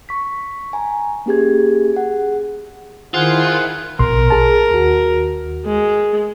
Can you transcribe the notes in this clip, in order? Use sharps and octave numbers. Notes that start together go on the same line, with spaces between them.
C#6 B6
G#5 A#5
A#3 C#4 G4 G#4 G#6
G#4 F#5
D#3 E4 F4 G#4 C5 F#5
A#1 B2 A#4 C6
G#4 A5
D#2 F#4
G#3